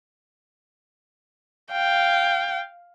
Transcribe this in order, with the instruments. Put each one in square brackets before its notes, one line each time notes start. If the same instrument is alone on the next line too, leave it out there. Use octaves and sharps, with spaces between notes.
[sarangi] F5 [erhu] G5